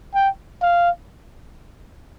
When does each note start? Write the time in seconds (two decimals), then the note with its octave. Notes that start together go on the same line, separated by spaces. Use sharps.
0.15 G5
0.62 F5